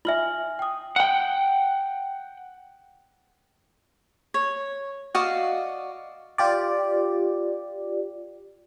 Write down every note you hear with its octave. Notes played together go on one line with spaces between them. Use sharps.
F4 E5 G#5 F6 F#7
G5 D#6
F#5 G5
C#5
F#4 D5 D#5 F5
F4 G4 D5